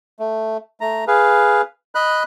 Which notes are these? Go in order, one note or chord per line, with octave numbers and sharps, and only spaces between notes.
A3
A3 A#5
G#4 B4 F5
D#5 B5 F#6